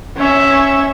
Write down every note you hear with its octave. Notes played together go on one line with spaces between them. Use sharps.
C#4 E5